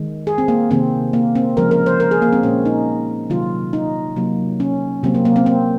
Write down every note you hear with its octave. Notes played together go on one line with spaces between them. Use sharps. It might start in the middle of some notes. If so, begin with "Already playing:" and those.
Already playing: D#3 G#3
G#4
C4
A#3
C3 D#3 A#3 C4
A#3
C4
C#3 F3 G#3 A#4
A#4
C5
A#4
G#4
A#3
C4
A#2 G#3 C#4
D#4
C3 D#3 F#3 A#3 F4
D#4
C3 F#3 A#3
C#4
C3 F#3 A#3 C4
A#3
A#3
C4
C4